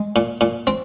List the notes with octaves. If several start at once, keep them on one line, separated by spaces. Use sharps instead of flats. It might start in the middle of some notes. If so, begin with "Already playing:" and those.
Already playing: G#3
A#2
A#2
C4